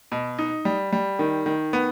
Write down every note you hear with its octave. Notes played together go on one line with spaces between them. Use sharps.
B2
D#4
G3
G3
D#3
D#3
B3